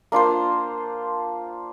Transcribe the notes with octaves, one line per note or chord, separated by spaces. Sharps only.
A#3 D4 F4 C5